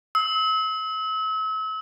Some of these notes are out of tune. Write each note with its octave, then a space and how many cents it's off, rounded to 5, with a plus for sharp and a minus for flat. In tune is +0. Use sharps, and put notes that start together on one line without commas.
E6 -40